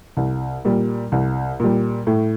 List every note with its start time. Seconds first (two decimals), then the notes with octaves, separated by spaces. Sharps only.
0.17 C2
0.65 A#2 G3
1.12 C2
1.60 A#2 G3
2.07 A2